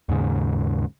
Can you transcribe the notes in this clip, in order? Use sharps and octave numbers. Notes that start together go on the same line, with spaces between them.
D#2 G#2 C#3